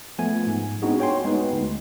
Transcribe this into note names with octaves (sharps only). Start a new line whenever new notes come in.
F3 A3 B3 G#5
G#2
B3 C4 D4 D#4 F#4 G#4
F#4 C#5 G5 G#5 C6
G#3 B3 D#4 B4
D2